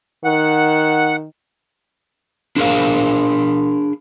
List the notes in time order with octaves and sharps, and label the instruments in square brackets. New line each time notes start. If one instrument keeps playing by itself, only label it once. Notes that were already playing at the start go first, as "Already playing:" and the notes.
[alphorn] D#3 [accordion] F#5
[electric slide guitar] D4 G#4 A#4 F5